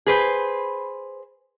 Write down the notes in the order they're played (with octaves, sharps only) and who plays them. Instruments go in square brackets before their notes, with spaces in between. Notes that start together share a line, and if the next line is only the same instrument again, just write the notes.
[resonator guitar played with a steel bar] G#4 B4 C5